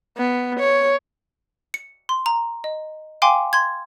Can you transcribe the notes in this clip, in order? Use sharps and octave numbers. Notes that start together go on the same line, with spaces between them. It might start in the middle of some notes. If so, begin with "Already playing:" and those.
B3
C#5
C#7
C6
A#5
D#5
F5 G5 G#5 C6 D6
C6 G#6